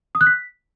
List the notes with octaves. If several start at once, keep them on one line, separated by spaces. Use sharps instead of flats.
D#6
F#6
B6